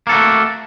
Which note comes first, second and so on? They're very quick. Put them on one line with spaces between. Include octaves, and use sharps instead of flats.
A#3 A4 F#4 A3